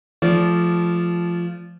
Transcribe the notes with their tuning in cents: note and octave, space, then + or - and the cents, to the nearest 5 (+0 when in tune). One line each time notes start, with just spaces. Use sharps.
F3 -10 A3 -30 D5 -30